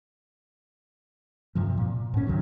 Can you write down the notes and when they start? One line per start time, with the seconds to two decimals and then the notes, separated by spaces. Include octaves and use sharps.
1.55 G2 C3 F3
1.78 A#2
2.14 G#2 C#4
2.27 F2 C3 D#3 F#3